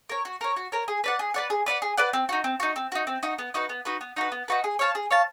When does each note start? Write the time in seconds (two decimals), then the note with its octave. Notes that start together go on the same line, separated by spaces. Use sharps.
0.09 A#4 C#5
0.25 F#4
0.41 A#4 C#5
0.56 F#4
0.72 A#4 C#5
0.88 G#4
1.04 B4 D5 F#5
1.19 G#4
1.34 B4 D5 F#5
1.50 G#4
1.66 B4 D5 F#5
1.82 G#4
1.97 B4 D5 F#5
2.13 C4
2.29 D#4 F#4
2.44 C4
2.60 D#4 F#4
2.76 C4
2.92 D#4 F#4
3.07 C4
3.23 D#4 F#4
3.38 B3
3.54 D#4 F#4 B4
3.69 B3
3.85 D#4 F#4 B4
4.01 B3
4.16 D#4 F#4 B4
4.32 B3
4.48 D#4 F#4 B4
4.64 G#4
4.79 C#5 F5 A5
4.95 G#4
5.11 C#5 F5 A5